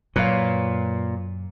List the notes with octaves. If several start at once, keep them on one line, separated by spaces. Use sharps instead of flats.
F#2 A#2 B4 C#5 F5